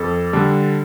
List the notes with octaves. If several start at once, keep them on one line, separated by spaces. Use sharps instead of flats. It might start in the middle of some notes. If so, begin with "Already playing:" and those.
Already playing: F2 A4
D3 G3 D4